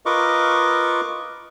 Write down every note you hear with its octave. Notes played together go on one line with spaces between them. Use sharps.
F4 A#4 B4 D#5 C#6 D6